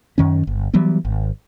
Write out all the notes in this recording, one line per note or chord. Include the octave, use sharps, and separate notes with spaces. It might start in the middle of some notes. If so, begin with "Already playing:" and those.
F#2 D#3 C#4
G1
E3 F#3 G3 B3
G#1